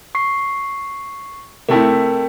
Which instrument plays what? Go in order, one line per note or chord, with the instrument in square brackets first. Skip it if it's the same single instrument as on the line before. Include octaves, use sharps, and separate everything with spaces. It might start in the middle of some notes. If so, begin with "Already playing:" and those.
[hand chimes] C#6 C7
[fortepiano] C3 A3 E4 [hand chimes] A#4 G5